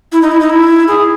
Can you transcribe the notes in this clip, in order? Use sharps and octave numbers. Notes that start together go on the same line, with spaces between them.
E4
D#4
E4
D#4
E4
G#4